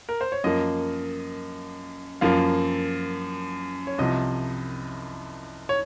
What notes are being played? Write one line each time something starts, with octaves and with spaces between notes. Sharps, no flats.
A#4
C5
C#5
F#2 F3 A#3 D#5
F#2 F3 A#3 F5
C#5
C2 C3 F3 D#5
C#5